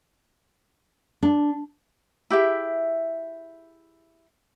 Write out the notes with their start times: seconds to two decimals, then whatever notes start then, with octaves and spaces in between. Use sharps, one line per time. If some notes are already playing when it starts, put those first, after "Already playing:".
1.23 D4
2.30 E4 G4 G#4 E5